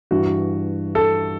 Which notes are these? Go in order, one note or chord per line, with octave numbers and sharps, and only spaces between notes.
G2 E3 F#4
A4